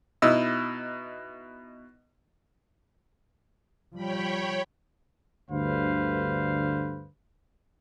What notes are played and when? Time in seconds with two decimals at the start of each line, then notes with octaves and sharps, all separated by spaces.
0.22 B2 D#4 E4 D#5 E6
3.95 F3 G3 C#5 G5 B5
5.50 D2 G2 D3 B4 C5 F5